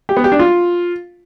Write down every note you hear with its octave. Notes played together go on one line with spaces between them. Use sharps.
G4
B3
G4
D4
F4